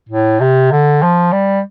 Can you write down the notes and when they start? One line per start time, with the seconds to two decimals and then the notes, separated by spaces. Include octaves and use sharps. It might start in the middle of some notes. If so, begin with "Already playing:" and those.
0.09 A2
0.40 C3
0.72 D3
1.03 F3
1.32 G3